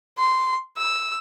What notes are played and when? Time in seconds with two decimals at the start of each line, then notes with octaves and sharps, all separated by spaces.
0.18 C6
0.77 E6